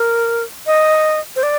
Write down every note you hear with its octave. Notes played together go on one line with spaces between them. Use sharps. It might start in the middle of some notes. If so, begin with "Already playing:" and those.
Already playing: A#4
D#5
C5
D5